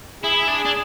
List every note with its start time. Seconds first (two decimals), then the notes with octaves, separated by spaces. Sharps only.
0.23 E4 G#4
0.48 D4
0.65 D4